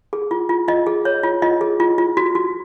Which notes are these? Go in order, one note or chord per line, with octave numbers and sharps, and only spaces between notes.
G#4
F4
F4
F4 D#5
G#4
C#5
F4
F4 D#5
G#4
F4
F4
F#4
F#4